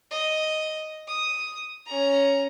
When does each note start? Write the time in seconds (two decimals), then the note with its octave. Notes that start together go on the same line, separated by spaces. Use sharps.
0.11 D#5
1.08 D#6
1.87 C#4 A#5